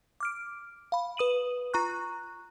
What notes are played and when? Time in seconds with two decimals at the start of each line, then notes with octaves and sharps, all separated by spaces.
0.20 D6 F6 D7
0.92 F5 B5
1.17 B4 D#6 D#7 F#7
1.74 F4 A#5 C#6 F#6